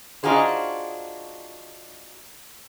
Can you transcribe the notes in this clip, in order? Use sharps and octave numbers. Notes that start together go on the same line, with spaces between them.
D4 D#4 F4 F#4 G#4 C5